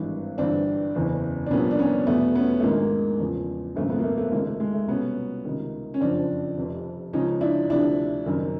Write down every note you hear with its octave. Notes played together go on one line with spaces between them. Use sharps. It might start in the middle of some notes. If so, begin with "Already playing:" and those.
Already playing: G#1 G2 E3
G1 G2 E3 C4 D4
F#1 E2 C#3 E3
D4
C2 A#2 F3 B3 C#4
D4
B3 C#4
E2 B2 A3 B3
B3 C#4
A3
A#1 G#2 D#3 G#3 A#3
E2 C#3 F3
G#1 F#2 C#3 A3 B3
A3 B3
A#3
A3
A3
C#2 C3 D#3 G#3 A#3
A3
G#3
A3
C2 B2 B3 C#4
C#2 C3 D#3
C#4
F#1 F2 C#3 F3 C4 D4
F1 F2 C3
C#2 C#3 F3 C#4 D#4
D4 E4
D2 C3 F3 D4 E4
F#1 F#2 D#3